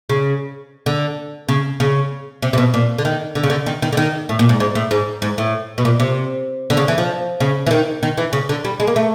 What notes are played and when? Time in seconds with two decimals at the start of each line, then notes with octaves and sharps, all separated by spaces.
0.10 C#3
0.86 D3
1.49 C#3
1.80 C#3
2.42 C3
2.53 C3
2.58 B2
2.74 A#2
2.98 D3
3.05 D#3
3.35 D3
3.43 C#3
3.50 D3
3.66 D#3
3.82 D#3
3.93 D3
3.97 D#3
4.29 A2
4.39 A#2
4.49 G#2
4.60 G#2
4.75 A2
4.91 G#2
5.22 G#2
5.38 A2
5.78 B2
5.85 A#2
6.00 C3
6.70 D3
6.77 C#3
6.88 E3
6.98 F3
7.40 C#3
7.67 E3
7.71 D#3
8.03 D#3
8.18 E3
8.33 C#3
8.49 D3
8.65 G3
8.80 G#3
8.87 A#3
8.96 A3